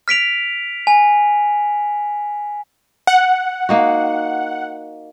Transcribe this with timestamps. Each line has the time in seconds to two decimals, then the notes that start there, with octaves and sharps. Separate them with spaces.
0.08 F6 B6 D7 F7
0.87 G#5
3.07 F#5
3.69 A#3 D#4 F#4